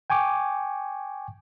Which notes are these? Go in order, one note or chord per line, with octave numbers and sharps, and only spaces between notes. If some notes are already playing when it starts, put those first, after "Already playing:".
G5 G#5 C#6 D6